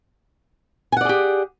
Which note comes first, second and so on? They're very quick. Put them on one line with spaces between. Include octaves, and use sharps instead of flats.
G#5 F#5 D5 G#4 G4